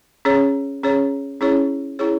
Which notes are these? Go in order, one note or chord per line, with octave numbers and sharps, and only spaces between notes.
C#4 G#4 C#5
C#4 G#4 C#5
C#4 E4 G#4 C#5
C#4 E4 G#4 C#5